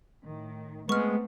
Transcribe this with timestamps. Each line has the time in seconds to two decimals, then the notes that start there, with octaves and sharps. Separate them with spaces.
0.24 A2 D#3
0.89 G#3 A3 B3 C4 C#6 F6